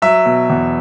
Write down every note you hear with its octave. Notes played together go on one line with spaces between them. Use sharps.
F#3 E5
B2
E2